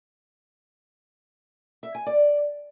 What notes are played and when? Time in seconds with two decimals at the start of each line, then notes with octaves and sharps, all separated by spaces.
1.83 E5
1.95 G#5
2.06 D5